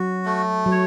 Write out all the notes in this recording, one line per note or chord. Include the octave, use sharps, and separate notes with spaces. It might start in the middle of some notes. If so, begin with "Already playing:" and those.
Already playing: F#3 F#4
A3
F#3
C#5